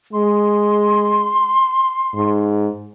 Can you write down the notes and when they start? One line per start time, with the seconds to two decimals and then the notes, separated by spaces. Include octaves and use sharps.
0.13 G#3 C6
2.15 G#2